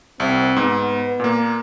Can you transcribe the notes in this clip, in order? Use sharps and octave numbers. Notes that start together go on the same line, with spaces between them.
C2 C4
G#2 B3
A#2 A#3